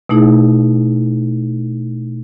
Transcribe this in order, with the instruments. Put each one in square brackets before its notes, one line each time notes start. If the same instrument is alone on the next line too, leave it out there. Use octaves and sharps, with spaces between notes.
[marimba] B2 A3 D#4 E4 G#4